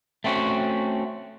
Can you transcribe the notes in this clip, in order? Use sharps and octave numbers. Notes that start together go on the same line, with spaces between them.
A3 C4 C#4 F#4